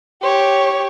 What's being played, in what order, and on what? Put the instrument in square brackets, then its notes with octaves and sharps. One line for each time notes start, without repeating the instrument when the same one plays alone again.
[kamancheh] G4 C#5